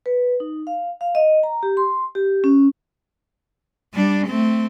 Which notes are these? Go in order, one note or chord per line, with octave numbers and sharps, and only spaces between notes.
B4
D#4
F5
F5
D#5
A#5
G4
C6
G4
C#4
G3 D4
A3 C4